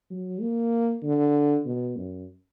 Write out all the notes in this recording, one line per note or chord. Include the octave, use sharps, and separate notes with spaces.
F#3
A#3
D3
B2
F#2